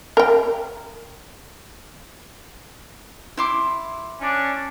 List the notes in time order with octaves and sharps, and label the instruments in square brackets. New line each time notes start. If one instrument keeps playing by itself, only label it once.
[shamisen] A#4 G5
[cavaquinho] E4 C6 D6
[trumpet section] C#4 D4